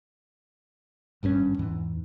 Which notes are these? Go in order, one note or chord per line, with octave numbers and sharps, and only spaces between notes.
G#1 G2 A#2 C#4
E2 G#2 E3